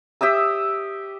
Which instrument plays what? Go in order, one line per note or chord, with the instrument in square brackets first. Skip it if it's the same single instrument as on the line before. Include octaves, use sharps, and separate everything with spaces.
[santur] G4 E5 D#6 E6